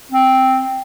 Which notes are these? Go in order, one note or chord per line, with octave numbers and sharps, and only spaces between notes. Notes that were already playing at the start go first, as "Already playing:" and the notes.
C4